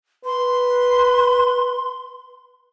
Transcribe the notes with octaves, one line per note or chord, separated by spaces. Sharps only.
B4 C6